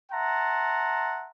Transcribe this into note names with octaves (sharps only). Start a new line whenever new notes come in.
E5 F#5 A5 A#5 C6